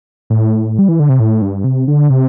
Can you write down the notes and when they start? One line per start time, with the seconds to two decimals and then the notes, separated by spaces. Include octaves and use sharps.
0.30 A2
0.79 G3
0.89 E3
1.00 D3
1.09 C3
1.20 A2
1.42 G2
1.64 C3
1.88 D3
2.10 C3